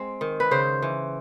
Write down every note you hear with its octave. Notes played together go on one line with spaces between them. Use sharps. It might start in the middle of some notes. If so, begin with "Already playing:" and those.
Already playing: G#3 C4
D#3
B4
C#3 C5
E3